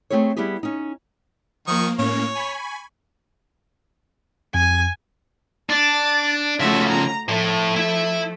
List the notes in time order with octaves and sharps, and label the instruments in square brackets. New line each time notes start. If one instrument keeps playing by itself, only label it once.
[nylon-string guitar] A3 A#3 C4 E4 G#4 C#5
G3 B3 E4 G4 G#4
C#4 D#4
[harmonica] D#3 C#6 D#6 [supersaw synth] F3 A#3
[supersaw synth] A2 A#3 C#4 [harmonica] C#5
[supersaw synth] G#5 B5 C#6
[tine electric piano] F2 [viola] G#5
[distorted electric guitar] D4 [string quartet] D6 A6
[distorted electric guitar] C#3 F3 [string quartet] A3 F#4 E5
[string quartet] A#5
[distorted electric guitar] A2 [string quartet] F3 A3
[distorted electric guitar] E4 E5